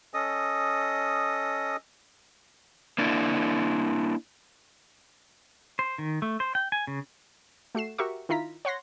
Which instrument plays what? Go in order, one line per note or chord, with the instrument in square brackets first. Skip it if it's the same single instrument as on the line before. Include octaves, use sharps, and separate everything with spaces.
[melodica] C#4 A4 D#5 D#6
[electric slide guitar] A#3 D4 E4
[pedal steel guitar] C5
D#3
A3
C5
G5
G#5
C#3
[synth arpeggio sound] A3 F#4 C7 E7
F#4 G4 A#4 E5 C#6
D#3 E4 F4 A#5 B6
C#5 F#5 C6 A#6